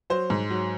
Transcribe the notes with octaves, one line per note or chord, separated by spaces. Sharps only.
F#3 C5
G#2
F#3